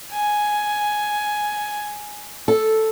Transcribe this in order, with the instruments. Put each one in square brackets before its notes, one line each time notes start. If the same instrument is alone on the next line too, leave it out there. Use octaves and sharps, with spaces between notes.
[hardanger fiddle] G#5
[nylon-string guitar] A4